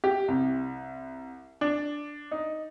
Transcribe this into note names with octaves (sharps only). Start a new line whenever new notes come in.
G4
C2
D4
D#4